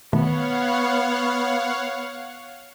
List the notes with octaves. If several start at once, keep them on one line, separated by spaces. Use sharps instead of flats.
B2 D#3 A3 B3 C#5 F5 F#5